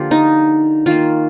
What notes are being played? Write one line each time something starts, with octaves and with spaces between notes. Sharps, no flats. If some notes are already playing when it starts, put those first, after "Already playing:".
Already playing: D3 F3 A#3 F4 G4
D#4
D#3 A#3 F4